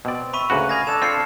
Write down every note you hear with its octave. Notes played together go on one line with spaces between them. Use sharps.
B2 C4 D5
E5 B5 C#6 D#7
D2 C#3 A#3 F#4 B4
D#5 F5 G#5 B5 G#6 A#6
D4 A4 E7
C4 F4 F6 C7 C#7